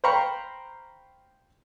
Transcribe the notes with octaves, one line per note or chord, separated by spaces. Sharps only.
C5 F5 G5 A#5 B5 C#6